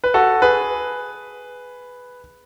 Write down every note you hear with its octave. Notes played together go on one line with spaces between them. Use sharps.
B4
F#4 A4
G#4 B4